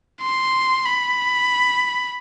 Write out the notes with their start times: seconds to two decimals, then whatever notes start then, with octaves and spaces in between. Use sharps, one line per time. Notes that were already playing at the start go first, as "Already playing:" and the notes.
0.21 C6
0.86 B5